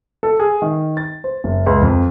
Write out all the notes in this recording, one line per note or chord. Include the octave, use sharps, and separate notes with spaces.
A4
G#4
D#3
A6
C5
F#1
C#2
F2